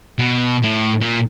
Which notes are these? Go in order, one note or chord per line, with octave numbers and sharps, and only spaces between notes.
B2
A2
A#2